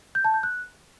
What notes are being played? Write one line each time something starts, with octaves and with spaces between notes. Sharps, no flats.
G6
A5
G6
F#6